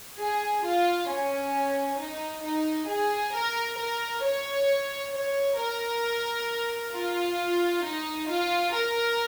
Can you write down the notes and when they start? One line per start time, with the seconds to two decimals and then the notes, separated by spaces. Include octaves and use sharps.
0.19 G#4
0.65 F4
1.10 C#4
2.00 D#4
2.45 D#4
2.90 G#4
3.34 A#4
3.79 A#4
4.24 C#5
5.14 C#5
5.60 A#4
6.94 F4
7.85 D#4
8.30 F4
8.74 A#4